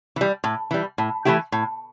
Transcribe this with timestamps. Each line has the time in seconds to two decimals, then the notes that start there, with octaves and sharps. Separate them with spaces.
0.16 E3 G3
0.44 A2
0.71 E3 G3
0.98 A2
1.25 E3 A3 E4 G4
1.52 A2